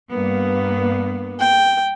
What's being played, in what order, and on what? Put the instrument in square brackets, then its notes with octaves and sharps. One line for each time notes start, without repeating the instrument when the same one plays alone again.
[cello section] G2 A#3 B3
[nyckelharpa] G5